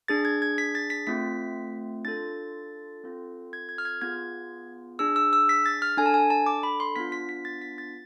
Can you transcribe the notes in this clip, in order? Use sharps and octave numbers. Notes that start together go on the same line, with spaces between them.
D4 G#4 A6
G#6
G#6
B6
A6
B6
A3 C4 F4 B6
D4 F4 A4 A6
C4 F4 A4
G#6
G#6
F6
G#6
B3 F4 G#4 G#6
D4 G#4 E6
E6
E6
B6
A6
F6
D4 A4 G#5
A5
G#5
A5
D6
B5
C6
B3 D4 F4 B6
B6
B6
A6
B6
A6